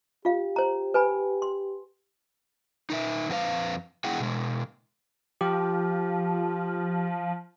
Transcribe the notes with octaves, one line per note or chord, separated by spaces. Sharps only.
F4 G4 F5
C5 A#5
B4 G#5 B5
C6
D#4 A#4 E5
F2 C4 F#4 B4 F5
B3 E4 G#4 F#5 G5
B2 G#3
F3 G4